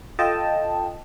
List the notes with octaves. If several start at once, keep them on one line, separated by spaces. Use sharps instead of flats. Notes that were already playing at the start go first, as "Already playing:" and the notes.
F4 A4 D#5 G5 A5